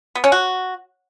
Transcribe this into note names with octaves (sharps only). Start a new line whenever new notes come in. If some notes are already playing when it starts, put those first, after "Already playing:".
B3
C#4
F#4